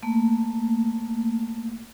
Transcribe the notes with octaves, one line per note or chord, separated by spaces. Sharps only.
A3 A#3